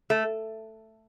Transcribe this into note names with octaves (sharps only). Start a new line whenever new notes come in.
A3